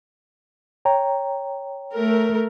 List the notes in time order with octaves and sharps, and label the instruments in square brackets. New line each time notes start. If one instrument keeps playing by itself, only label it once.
[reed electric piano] C#5 G5 A#5
[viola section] A3 A#4